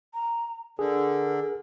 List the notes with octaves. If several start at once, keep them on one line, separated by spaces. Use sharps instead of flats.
A#5
D3 G#4 A#4